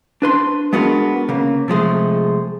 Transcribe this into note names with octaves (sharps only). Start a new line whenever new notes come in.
D4 B4 C6
G#3 B3 D4 F#4 A#4
C#3 A#3
C3 F3 G#3 A3